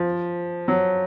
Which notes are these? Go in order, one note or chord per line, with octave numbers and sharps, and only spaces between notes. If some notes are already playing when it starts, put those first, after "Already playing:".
Already playing: F3
F#3